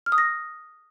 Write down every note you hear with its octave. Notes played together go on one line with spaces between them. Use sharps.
F6
D#6
A#6